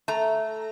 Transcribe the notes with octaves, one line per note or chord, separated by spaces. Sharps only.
A3 A#5